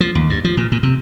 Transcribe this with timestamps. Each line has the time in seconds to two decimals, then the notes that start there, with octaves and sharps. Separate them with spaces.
0.01 F3
0.15 D#2
0.30 G2
0.44 F3
0.57 A#2
0.72 A#2
0.83 C3